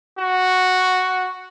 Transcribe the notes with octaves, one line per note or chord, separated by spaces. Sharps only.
F#4